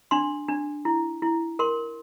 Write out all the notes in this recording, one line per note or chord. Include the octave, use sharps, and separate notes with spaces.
D4 C6
D4
E4
E4
A#4 C6